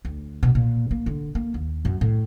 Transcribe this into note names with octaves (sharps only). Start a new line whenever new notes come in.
D2
B2
A#2
A#3
D3
A#3
D#2
F#2
A2